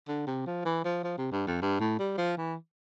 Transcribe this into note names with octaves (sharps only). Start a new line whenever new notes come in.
D3
C3
F3
E3
F3
F3
C3
G2
F2
G2
A2
G3
F3
E3